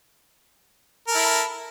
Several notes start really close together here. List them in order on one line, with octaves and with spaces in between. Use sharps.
A#4 A4 E4